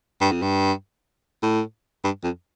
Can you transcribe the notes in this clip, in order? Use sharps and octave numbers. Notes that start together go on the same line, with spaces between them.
G2
F2
G2
A2
G2
F2